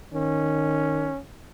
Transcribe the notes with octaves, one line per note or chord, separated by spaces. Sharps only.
D#3 C#4